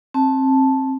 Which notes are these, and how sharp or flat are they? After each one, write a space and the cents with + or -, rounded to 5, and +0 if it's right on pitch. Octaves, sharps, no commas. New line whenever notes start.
C4 +25 A5 -5